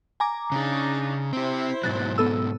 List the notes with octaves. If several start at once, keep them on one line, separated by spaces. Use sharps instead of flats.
G#5 A#5 D6
C#3 D4 D#4 G#4
C4 E4 G4 C5
G#2 B2 F#3 F#6 A6
B3 A4 E6